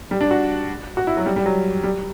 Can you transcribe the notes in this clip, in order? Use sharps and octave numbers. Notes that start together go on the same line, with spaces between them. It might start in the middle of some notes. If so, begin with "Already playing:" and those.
G3
D4
F#4
F#4
E4
F#3
G3
G3
F#3
G3